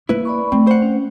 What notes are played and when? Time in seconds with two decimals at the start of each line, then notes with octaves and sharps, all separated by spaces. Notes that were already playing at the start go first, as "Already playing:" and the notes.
0.09 A#3 E4 B4
0.25 D5 B5 C#6
0.52 A3 C4
0.67 C5 F#5
0.82 C#4